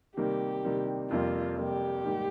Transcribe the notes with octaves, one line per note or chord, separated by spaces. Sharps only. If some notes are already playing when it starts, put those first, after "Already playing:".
C3 D#3 G3 A#3 G4
C3 D#3 G3 A#3
F2 C3 G3 A#3 F4
F2 C3 G3 A#3 G4
G#2 D#3 G3 A#3